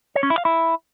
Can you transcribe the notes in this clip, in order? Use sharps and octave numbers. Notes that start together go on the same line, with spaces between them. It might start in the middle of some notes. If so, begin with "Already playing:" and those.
C#5
C#4
E4
F5
E4